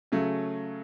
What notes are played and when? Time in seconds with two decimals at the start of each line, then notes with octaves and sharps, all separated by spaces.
0.12 C#3 F#3 A3 C#4